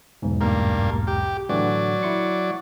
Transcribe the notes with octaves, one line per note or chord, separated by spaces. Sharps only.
B1 E2 G#2
G2 A#3
G4
A2 D3 E3 F#3 D5
E4 C6 C#7